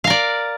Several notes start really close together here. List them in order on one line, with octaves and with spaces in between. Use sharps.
F5 A#4 D5